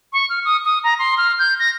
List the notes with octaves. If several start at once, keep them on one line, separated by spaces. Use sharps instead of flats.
C#6
F6
D#6
D#6
A#5
C6
F6
G6
A#6